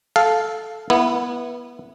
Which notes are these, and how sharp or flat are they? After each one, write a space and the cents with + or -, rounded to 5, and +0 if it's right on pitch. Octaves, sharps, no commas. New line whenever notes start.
A4 -10 F5 +0
B3 -20 E4 +10